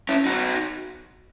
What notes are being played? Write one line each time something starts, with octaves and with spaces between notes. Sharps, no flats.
C#4 E4
D#4 F#4